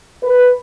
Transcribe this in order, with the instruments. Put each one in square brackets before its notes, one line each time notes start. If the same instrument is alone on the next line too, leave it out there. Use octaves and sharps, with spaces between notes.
[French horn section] B4